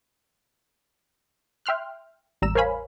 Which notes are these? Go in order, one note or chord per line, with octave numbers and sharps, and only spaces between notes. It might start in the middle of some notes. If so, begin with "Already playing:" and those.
E5 G5 C6 F6 F#6
A1 E2 G3 A#5 E6 E7
A#4 C5 C#5 F5 G#5 B5